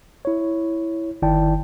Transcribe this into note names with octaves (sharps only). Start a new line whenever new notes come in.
E4 C#5
G1 D#3 E4 D5 G5 A5